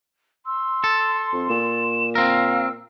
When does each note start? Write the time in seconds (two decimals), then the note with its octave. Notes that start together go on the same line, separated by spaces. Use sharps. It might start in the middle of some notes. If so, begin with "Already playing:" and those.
0.46 C6 E6
0.84 A4
1.33 F2
1.50 A#2 E7
2.15 C4 A#4 F5 E6